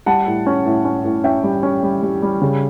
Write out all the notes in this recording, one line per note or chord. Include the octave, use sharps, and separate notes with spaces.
G3 F#5 A5
A2
C#4
A2
C#4
A2
C#4 E5 G5
G3
C#4
G3
G3
G3
C#3